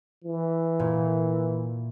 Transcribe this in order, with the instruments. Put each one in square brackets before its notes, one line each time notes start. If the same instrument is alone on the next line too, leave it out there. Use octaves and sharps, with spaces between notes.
[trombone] E3
[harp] A#2